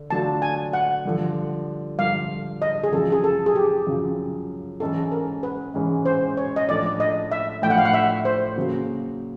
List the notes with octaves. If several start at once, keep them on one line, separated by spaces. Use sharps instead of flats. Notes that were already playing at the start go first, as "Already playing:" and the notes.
Already playing: D3
D3 F#3 A3 D4 F4 A5
G#5
F#5
G2 D3 F3
G2 D3 F3 F5
D#5
G#4
F#2 C#3 F3 A4
G#4
A4
G#4
G4
F#2 C#3 F3
G#2 E3 G#3 C#4 A4
A#4
B4
G#2 E3 G#3 C#4
C5
C#5
D#5
A2 F3 A3 D4 D5
D#5
E5
A2 F3 A3 D4 G5
F#5
F5
F#5
E5
C5
C#3 F#3 A#3